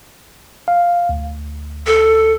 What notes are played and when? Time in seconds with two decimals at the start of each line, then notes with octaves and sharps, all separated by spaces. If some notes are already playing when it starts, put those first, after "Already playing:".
0.68 F5
1.09 D2
1.86 A4